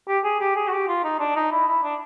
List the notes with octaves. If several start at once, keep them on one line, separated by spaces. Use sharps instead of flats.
G4
G#4
G4
G#4
F#4
G4
F4
D#4
D4
D#4
E4
E4
D4